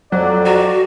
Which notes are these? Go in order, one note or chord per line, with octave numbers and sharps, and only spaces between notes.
F2 F#3 D5
F#4